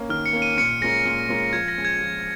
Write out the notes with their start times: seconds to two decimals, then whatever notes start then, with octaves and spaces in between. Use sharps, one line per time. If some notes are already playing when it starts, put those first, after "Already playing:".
Already playing: A#3 C#4
0.09 D#3 F6
0.26 C#7
0.33 A#3 C#4
0.42 D#7
0.57 A#2 C#7
0.81 G#3 C#4 F4 A#4 A#6
1.05 A#2
1.29 G#3 C#4 F4 A#4
1.53 F3 G#6
1.68 A#6
1.77 G#3 C#4
1.85 G#6
2.00 F3